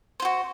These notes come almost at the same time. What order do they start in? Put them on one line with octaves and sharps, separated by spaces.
C5 F4 F#4